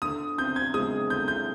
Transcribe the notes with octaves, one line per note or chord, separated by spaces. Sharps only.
D3 D#6
C4 G6
G#6
G#3 D#6
D3 G6
G6